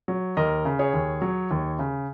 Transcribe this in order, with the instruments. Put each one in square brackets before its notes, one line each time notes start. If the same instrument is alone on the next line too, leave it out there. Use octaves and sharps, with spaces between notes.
[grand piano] F#3
D#2 A#4 D#5
C#3
G#4 C#5
D#2
F#3
D#2
C#3